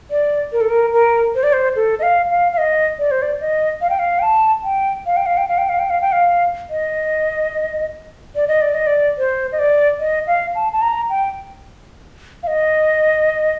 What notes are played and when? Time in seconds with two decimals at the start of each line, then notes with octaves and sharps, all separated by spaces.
0.11 D5
0.52 A#4
0.61 A4
0.69 A#4
0.93 A#4
1.35 C5
1.43 D5
1.53 C5
1.76 A4
1.99 D#5
2.03 F5
2.30 F5
2.52 F5
2.58 D#5
2.99 D5
3.11 C5
3.22 D5
3.41 D#5
3.81 F5
3.90 G5
3.99 F5
4.19 G5
4.22 A5
4.64 G5
5.06 F5
5.17 G5
5.26 F5
5.37 G5
5.49 F5
5.58 G5
5.69 F5
5.79 G5
5.90 F5
6.01 G5
6.12 F5
6.70 D#5
8.36 D5
8.48 D#5
8.61 D5
8.74 D#5
8.87 D5
9.18 C5
9.52 D#5
9.59 D5
10.00 D#5
10.27 F5
10.55 A5
10.73 A5
10.82 A#5
11.10 G5
12.43 F5
12.47 D#5